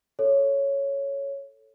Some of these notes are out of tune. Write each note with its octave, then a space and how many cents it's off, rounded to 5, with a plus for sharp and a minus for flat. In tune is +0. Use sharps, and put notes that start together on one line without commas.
A4 +0 C#5 +0